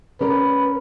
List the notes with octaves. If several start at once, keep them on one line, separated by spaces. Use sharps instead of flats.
C#4 A#4 B4 D5